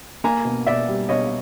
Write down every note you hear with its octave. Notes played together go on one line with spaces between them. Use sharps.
A#3 G#5 A#5
B2
B2 D5 E5
G3
B2 C#5 D#5